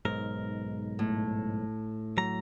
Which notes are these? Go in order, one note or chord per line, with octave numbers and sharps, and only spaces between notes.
B1 G#2 A#4
A2
F#3 A#5